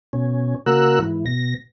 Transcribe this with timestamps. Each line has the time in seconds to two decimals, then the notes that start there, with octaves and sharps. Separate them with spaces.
0.13 B2 C#4
0.66 C#3 A#3 F#4 A#4 E6 F#6
0.99 G#2 E3
1.26 B2 A#6